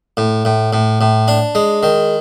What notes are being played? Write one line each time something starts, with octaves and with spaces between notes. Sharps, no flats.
A2
A2
A2
A2
D4
G#3
D#3